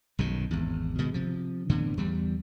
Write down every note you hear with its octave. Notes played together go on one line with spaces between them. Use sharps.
B1 F#2 D#3
G#1 E2
B2 D#3 G#3
C3 F3
A2 D3 E3 B3
E2 G3